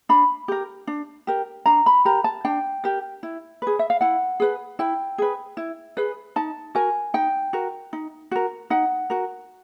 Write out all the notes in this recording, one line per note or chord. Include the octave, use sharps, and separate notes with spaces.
D4 B5
G4 A#4
D4
G4 A#4
D4 A#5
B5
G4 A#4 A#5
A5
D4 G5
G4 A#4
E4
G#4 B4
E5
F5
E4 F#5
G#4 B4
E4 G5
G#4 B4
E4
G#4 B4
D#4 A5
F#4 A#4 G#5
D#4 G5
F#4 A#4
D#4
F#4 A#4
D#4 F#5
F#4 A#4